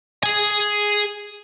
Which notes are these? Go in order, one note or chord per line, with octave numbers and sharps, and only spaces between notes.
G#4 G#5